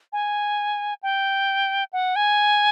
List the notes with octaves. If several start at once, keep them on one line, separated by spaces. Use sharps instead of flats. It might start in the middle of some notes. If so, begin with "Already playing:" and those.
G#5
G5
F#5
G#5